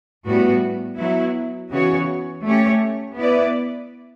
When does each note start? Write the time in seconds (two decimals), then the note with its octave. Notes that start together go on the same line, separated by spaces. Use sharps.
0.25 A2 G3 B3 F#4
0.98 F#3 B3 E4
1.70 C#3 E3 B3 F#4 C#5
2.43 A3 C#4 G4 C#5
3.16 B3 E4 B4 D5